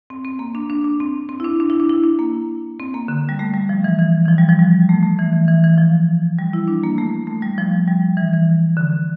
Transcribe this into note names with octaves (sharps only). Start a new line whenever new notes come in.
C4
C4
A#3
D4
D4
D4
C4
C4
E4
D4
D4
E4
D4
E4
D4
A#3
C4
A#3
D3
G3
A3
G3
F3
E3
E3
E3
F3
G3
F3
G3
A3
A3
E3
E3
E3
E3
F3
G3
E4
D4
A#3
A3
A3
G3
F3
G3
E3
E3
D3